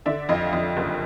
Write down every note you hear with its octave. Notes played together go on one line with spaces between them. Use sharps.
D3 D5 E5
F2 D#5 F5
F2
F#1